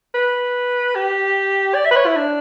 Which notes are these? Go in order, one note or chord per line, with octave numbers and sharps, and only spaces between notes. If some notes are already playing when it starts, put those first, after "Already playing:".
B4
G4
D5
E5
B4
C#5
E4
D4